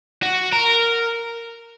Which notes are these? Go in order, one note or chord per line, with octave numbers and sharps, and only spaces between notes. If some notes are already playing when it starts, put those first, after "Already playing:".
F#4
A#4